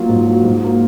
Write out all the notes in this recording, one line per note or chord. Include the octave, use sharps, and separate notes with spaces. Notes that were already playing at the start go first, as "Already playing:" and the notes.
Already playing: F#3 A#3 F4
G#2
F#3 A#3
G#2
F#3 A#3